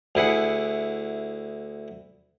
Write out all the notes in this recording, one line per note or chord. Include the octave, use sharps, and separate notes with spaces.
D2 E4 G#4 F#5